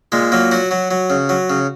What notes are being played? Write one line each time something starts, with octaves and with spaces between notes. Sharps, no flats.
A#2 G#3
F#3 A#3
F#3 F#4
F#3
F#3
C#3
F#3
C#3